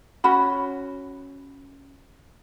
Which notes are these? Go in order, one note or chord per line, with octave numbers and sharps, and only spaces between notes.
C#4 F#4 B5